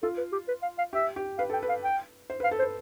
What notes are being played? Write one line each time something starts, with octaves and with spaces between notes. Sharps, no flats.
F4 A4
B4
G4
B4
F5
F5
G4 E5
G4
B4 F5
A4 G5
B4
F5
G5
C5
B4
F5
A4
C5
B4